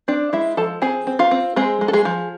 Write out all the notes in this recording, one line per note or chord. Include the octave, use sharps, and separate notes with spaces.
C4 D4 D5
G#3 E4 E5
F3 A4 A5
C4 G#4 G#5
C4
F4 F5
C4
G#3 C4 G#4
G#3
A4
G#3 G#4
F3